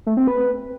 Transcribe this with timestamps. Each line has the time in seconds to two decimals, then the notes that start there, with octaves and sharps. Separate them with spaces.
0.07 A3
0.17 C4
0.27 B4